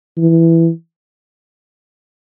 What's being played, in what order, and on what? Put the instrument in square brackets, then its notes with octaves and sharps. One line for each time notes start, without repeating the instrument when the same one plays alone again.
[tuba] E3